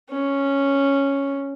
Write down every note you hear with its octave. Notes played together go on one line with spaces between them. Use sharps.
C#4